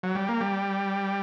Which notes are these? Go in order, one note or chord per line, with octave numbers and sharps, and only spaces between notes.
F#3
G3
A#3
G3